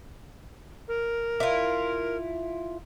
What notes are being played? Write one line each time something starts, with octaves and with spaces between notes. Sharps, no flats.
A#4
E4 F4